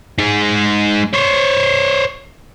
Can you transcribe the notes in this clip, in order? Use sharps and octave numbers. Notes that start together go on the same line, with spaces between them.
G#3 D#4
C5 C#5